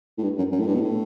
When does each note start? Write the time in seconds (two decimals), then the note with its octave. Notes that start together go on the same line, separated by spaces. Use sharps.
0.18 A2
0.23 G2
0.38 F#2
0.52 F#2
0.60 A2
0.67 G2
0.75 B2
0.81 A2